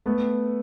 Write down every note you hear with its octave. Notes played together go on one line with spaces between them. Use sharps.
A3 B3